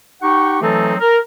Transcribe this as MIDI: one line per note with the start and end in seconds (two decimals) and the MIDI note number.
0.22 0.58 63
0.22 0.58 67
0.22 0.58 78
0.22 0.58 79
0.22 0.58 85
0.61 0.94 52
0.61 0.94 54
0.61 0.94 57
0.61 0.94 60
0.61 0.94 63
0.61 0.94 69
0.99 1.18 70